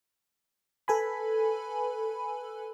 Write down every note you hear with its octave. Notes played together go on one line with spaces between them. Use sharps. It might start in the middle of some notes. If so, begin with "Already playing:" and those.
A4 B4 G#5 B5